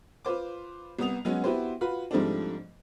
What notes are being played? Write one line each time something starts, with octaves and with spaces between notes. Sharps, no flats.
F4 B4 C5 D6
C2 B3 D#6 F7
F#3 G#3 B3 C#4 F#4
B3 E4 F#4 G4 B4 C5
F4 F#4 B4 B5
G#2 F3 G3 A3 C4 D4